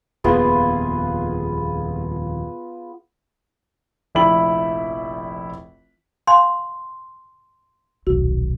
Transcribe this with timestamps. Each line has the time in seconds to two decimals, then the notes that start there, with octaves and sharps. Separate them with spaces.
0.24 D#1 F2 A#3 B3 F4 G#4
4.15 F1 A#1 E4 G5 B5 F#7
6.27 F5 G#5 C6
8.07 D#1 B1 F#4